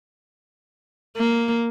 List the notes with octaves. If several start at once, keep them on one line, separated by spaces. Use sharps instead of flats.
A#3